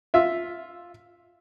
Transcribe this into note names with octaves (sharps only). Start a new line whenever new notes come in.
F4 E5